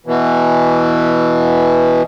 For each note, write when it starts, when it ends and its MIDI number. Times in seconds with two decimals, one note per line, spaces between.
0.06 2.02 47
0.06 2.02 52